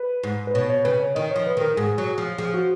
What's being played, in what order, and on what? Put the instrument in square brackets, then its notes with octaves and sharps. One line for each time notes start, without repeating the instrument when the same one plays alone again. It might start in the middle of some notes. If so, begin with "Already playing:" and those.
Already playing: [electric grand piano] B4
[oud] G#2
[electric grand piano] B4
[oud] B2 [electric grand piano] C#5
[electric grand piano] C#5
[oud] C#3 [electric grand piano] B4
[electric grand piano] C#5
[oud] D#3 [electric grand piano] D#5
[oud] F3 [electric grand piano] C#5
[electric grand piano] B4
[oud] D#3 [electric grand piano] A#4
[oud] G#2 [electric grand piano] G#4
[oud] F#3
F3
[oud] F3 [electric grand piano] G#4
[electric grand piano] F#4